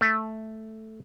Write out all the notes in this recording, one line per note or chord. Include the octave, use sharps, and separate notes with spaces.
A3